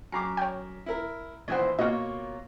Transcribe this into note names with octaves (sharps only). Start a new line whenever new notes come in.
F#2 A#5 D6 C7
C#5 G5
E4 A#4
A#1 D#3 E3 E4 C5 F#5 G#6
B2 A#3 F4 C#5 D#5 F5